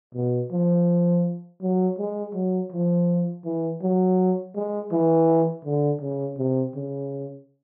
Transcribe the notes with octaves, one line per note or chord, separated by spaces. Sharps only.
B2
F3
F#3
G#3
F#3
F3
E3
F#3
G#3
E3
D3
C#3
C3
C#3